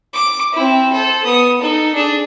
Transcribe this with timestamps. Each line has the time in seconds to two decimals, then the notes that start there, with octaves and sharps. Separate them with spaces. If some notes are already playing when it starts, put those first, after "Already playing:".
0.14 D6
0.53 C4 E4
0.92 A4 C5
1.24 B3 D#6
1.60 D#4 A4
1.94 D4 G#4